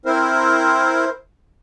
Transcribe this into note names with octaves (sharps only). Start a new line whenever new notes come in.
C4 E4 A#4 C5